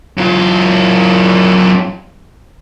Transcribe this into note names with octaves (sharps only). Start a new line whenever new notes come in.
F#2 F4